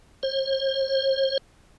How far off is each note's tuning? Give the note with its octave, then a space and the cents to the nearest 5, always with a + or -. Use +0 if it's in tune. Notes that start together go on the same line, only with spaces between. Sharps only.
C5 +45